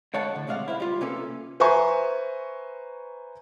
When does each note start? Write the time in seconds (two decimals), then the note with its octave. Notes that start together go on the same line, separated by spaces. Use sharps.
0.14 D3 G#3 C#5 F5 F#5 A5
0.35 A2 D3
0.47 B1 C3 G#3 D#4 F5 F#5
0.68 E4 C5 F5
0.80 G3 F4
1.01 C3 A#3 C#4 F4 A4 B4
1.60 B4 C5 E5 G#5 A#5 C#6